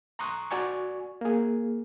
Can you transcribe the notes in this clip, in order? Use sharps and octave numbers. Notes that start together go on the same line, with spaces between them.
A#5 C6 C#6 D#6 F#6
F#4 D5 G#5 C#6
A#3 G#4